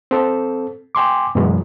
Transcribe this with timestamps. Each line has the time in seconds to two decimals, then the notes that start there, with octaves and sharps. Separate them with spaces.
0.11 C4 A4
0.95 G5 G#5 C6 D6
1.35 F#2 B2 E3 F#3 G#3